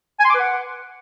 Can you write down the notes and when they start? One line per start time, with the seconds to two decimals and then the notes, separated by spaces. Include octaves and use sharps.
0.19 G#5
0.24 C6
0.30 D6
0.35 B4
0.40 F#5